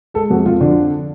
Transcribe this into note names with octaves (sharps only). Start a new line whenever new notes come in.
G#3 A4
F2 F#4
F2 F4
D3 D4